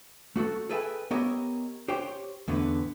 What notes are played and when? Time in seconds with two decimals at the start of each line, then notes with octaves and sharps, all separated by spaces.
0.36 A3 F#4 G#4 A4
0.69 G#4 A4 B4 E5 G5 G#5
1.11 B3 G4 A#4 C#5 D#5 E5
1.88 G4 C5 C#5 G5
2.48 E2 A2 D3 B3